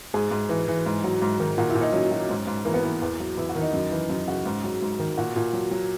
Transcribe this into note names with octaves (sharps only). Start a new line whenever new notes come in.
G#2 G#4
G#2
E3
E3
G#2
F#3
G#2
D#3
A#2 F#4
E4
A#2
D#4
F#3 C#4
F#3
G#2
G#2
E3 A#3
B3
E3 A#3
E2
F#3
E2 E4
F#4
D#3
D#4
F#2
E3
F#2 D#4
C#3 F#4
G#2
F#3
G#2
D#3
A#2 F#4
A#2
F#3
F#3